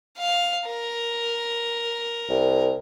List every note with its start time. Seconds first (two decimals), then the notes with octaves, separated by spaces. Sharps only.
0.18 F5
0.67 A#4
2.29 C2